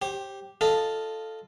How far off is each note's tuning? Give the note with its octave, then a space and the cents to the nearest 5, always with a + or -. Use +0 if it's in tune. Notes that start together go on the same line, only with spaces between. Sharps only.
G4 +0 C5 +40
F4 +0 A4 +0 D#5 -10